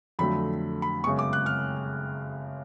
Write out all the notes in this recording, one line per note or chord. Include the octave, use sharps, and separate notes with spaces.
F2 D3 F#3 A3 B5
B5
F#2 C#3 G#3 B3 C#6
D6
F#6
F6